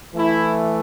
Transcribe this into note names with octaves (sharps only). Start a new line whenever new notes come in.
E3 A3 E4